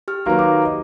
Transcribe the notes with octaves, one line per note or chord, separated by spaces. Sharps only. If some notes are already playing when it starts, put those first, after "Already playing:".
G4 F6
D#3 F#3 A#3 G4 B4
D6
D#5